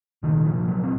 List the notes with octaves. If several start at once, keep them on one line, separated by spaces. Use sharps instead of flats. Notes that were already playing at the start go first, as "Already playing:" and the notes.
C2 A#2 D#3
F3
F#3
C4